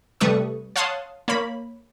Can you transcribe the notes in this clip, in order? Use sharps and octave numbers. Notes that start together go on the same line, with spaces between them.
C3 G3 A3 B4 C#6 D#6
C#5 F5 F#5 A5 C6 D#6
A#3 C#5 B5